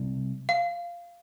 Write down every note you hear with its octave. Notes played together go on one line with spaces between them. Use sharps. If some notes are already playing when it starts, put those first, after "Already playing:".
Already playing: C3 G3 C4
F5